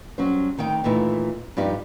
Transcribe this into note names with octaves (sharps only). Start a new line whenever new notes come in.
F#3 G3 C#4 C5
D2 D#3 D#4 G5
D#2 A#2 E3 A3 D#4 E4
G2 F3 G3 D#4 G4